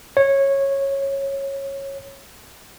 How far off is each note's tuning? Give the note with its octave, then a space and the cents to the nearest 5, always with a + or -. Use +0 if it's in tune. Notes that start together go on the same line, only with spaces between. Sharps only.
C#5 -15